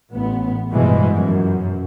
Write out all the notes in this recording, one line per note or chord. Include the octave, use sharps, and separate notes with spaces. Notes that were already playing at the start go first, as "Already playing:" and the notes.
A1 B3
G2 B2 E3 F3 G#3
F#2